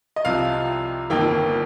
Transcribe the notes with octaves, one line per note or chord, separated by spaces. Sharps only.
D#5
C2 C3 F3 F5
G1 F2 D#3 A#3 G5